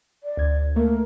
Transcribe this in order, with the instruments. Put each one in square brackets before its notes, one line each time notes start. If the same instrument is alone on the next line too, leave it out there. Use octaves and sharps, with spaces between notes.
[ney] D5
[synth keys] D2 G#6
[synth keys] A3 A#3 [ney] A#4